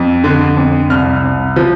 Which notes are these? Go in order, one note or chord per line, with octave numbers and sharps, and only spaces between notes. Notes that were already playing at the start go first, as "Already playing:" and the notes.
Already playing: F2
D3
F2
C2 F6
C2
F3